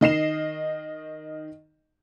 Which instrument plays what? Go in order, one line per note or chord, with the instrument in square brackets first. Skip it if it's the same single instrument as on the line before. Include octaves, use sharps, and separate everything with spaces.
[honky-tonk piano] D#3 D#5 C7 E7